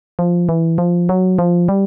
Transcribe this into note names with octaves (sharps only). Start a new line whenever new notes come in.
F3
E3
F3
F#3
F3
G3